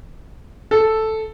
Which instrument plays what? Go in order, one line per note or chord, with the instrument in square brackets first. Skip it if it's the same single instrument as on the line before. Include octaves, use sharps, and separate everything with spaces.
[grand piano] A4